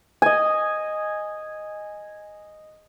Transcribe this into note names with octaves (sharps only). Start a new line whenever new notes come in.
D#5 G#5